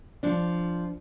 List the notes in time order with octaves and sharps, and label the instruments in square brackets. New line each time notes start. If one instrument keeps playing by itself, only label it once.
[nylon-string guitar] F3 D4